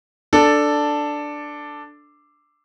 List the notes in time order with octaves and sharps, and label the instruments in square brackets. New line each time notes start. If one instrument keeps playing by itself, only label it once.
[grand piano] D4 A4